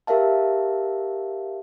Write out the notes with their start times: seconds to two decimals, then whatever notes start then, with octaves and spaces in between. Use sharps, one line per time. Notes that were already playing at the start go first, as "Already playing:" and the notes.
0.07 G4 A#4 E5 F5 A5